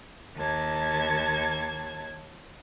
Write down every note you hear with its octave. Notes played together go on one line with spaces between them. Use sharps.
D#2 A5 G#6